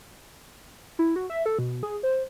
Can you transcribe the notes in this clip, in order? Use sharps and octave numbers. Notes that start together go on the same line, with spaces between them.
E4
F#4
E5
A4
B2
G#4
C5